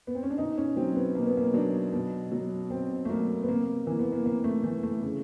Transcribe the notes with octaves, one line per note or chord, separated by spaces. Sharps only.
B3
C4
C#4
D4
B2 D#4
C#4
F#3 C4
B3
B2 A#3
B3
A#3
F#3 D4
B2
F#3
B2 C4
A3
F#3 A#3
B3
C3 A#3
E3 A#3
B3
A#3
C3 A#3
A3
E3 A3
A3
C#3